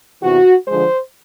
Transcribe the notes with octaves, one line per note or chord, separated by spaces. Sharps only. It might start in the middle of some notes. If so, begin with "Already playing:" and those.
E2 C3 E3 F#4
D3 F3 G#3 C5